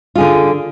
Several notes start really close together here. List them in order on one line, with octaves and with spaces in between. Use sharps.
F4 G#4 D3